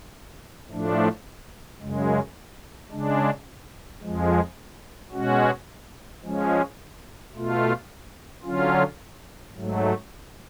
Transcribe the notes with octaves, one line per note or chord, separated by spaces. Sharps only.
A2 F3 A3 D4
F#2 C#3 G#3
C#3 G#3 D4
F2 F3 G#3
B2 G#3 C#4 F#4
F3 G#3 C#4
B2 A3 F4
D3 F#3 C#4 F4
G#2 F#3 A3